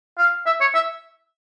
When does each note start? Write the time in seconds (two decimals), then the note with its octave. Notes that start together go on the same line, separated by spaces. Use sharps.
0.18 F5
0.46 E5
0.61 C#5
0.74 E5